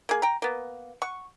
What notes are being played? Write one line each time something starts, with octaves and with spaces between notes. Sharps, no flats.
A#3 G#4
G5 A#5
A#3 B3
F#5 C#6